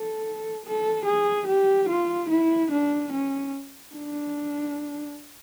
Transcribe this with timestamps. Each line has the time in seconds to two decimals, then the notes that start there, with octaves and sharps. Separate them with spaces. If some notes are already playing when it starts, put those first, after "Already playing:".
Already playing: A4
0.65 A4
1.05 G#4
1.47 G4
1.89 F4
2.30 E4
2.71 D4
3.13 C#4
3.95 D4